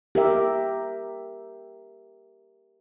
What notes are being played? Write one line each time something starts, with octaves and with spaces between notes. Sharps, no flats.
G4 A#4 E5